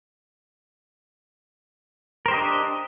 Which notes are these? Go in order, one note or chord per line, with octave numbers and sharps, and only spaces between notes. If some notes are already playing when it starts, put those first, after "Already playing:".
D4 G4 A#4 C5 D#5